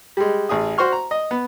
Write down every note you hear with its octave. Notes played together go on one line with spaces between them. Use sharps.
G3 G#3
A1 G#4 D#6
F#4 C5 C6 C#6 F6
A#5
D#5
B3